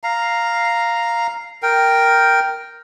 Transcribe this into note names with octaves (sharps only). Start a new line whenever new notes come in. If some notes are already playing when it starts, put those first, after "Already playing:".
F5 A#5
A#4 G5